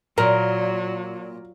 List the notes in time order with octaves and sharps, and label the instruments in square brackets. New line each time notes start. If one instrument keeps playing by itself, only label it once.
[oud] A#2 [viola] F#3 [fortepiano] A#4